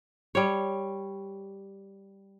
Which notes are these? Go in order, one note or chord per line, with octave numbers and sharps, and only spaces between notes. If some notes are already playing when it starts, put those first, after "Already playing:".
G3 C#5